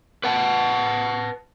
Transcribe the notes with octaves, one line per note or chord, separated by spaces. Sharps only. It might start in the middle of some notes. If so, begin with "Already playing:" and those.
B4 F#5 A5